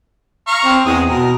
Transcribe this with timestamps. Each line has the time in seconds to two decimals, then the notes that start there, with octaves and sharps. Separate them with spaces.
0.48 F5 A#5 C#6
0.65 C4
0.86 E2 G#3 D#6
1.10 B2 A#4